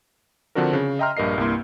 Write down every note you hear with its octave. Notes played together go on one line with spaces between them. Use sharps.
D3 F3 C4 D4 F#4 A#4
C#3
D#5 E5 G5 A#5 C6 F6
A#1 G2 A#4 D#5 C7
C2 G2 A#3 E4 C6